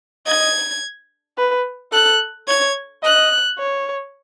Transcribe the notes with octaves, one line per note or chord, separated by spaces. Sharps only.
D#5 G#6
B4
A4 F#6
C#5 G#6
D#5 F#6
C#5